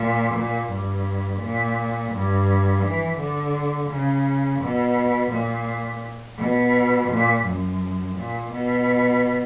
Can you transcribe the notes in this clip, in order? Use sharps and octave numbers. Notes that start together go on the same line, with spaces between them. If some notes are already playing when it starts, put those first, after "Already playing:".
Already playing: A#2
A#2
G2
A#2
G2
E3
D3
C#3
B2
A#2
B2
A#2
F#2
A#2
B2